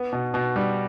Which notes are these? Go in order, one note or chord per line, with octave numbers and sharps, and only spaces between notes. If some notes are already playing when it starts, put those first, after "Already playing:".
Already playing: B3
B2
B2
G3